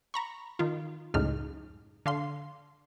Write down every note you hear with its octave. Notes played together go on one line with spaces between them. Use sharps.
A#5 B5 C#6
D#3 F4
C#2 F#2 A2 C#3 D#4 F6
D3 F5 C6